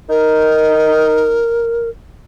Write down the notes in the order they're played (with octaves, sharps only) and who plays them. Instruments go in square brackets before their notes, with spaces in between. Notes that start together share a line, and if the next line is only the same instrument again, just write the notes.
[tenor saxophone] D#4 [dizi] A#4